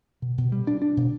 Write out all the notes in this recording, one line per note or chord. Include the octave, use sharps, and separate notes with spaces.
B2
B2
G3
D4
D4
B2